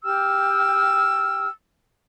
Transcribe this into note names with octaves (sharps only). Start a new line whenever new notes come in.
G4 G5 E6 F6